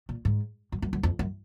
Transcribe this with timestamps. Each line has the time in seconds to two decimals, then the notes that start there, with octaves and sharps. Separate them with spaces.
0.09 A#2
0.25 G#2
0.72 F#2
0.82 F#2
0.93 F#2
1.03 F2
1.19 F#2